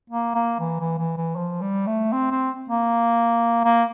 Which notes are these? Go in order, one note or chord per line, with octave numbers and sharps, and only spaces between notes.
A#3
A#3
E3
E3
E3
E3
F3
G3
A3
C4
C4
A#3
A#3